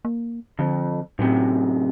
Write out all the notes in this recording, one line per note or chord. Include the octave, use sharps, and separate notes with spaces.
A#3
F2 D3
F#2 A2 C3